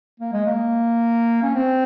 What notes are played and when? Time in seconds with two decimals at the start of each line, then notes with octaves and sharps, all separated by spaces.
0.20 A#3
0.32 G#3
0.46 A#3
1.42 C#4
1.54 C4